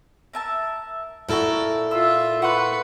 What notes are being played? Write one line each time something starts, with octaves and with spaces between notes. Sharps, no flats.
A#4 E5 A5
A#2 E4 F#4 A4 A#4
F4 E5 E6
B4 F#5 C6 C#6 F#6